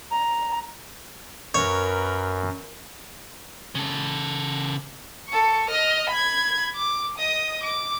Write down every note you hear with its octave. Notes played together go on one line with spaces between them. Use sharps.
A#5
F#2 A#4 B4 C#5
C#3 A4
A4 C#6
D#5 F6
B5 G#6
D6
D#5 D#6
D6